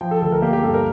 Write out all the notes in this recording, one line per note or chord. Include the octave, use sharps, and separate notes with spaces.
F3 G5
A4
D2 A4
A#4
A#3 G4
G4
G2 A4
A#4